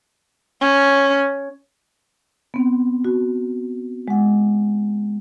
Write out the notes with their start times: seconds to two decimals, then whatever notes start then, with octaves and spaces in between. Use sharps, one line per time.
0.61 C#4
2.54 B3 C4
3.05 F#4
4.08 G#3 F#5